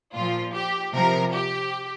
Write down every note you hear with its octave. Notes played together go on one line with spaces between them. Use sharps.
A#2 F3 F4
G4
C3 F3 A#4
G4